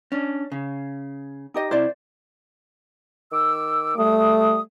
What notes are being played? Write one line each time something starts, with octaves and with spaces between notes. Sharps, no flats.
C#4 D4
C#3
D#4 G4 D#5
C3 E4 C5 D5
D#3 D6 E6
G3 A3 D#6